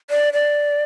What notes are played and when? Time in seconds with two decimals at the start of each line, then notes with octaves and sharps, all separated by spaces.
0.10 D5
0.33 D5